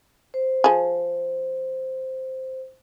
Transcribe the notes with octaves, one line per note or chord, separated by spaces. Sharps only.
C5
F3 G#4